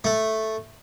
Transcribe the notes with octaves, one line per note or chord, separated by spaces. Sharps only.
A3